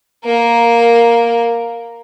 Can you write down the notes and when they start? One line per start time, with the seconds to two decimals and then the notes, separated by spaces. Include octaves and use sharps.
0.25 A#3 A#4